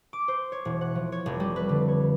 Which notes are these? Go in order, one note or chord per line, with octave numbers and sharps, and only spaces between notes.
D6
C5
C#5
E1
F#5
F3
C#5
F1
G3
B4
D3
C#5